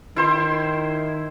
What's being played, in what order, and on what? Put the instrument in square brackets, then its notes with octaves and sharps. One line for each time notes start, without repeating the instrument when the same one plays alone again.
[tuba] D#3 [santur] E4 C5 C6